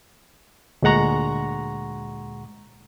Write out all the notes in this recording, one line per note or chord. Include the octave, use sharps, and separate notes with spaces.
D2 A#2 G#3 F#5 A#5 C#6